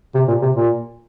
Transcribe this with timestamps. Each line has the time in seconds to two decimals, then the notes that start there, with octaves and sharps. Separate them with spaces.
0.15 C3
0.28 A#2
0.42 C3
0.56 A#2